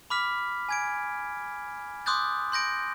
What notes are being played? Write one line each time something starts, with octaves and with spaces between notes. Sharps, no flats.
B5 D6 F6 B6
G#5 G#6 D7
C6 D6 D#6 F#6 G6 A6
C6 G6 A#6 D7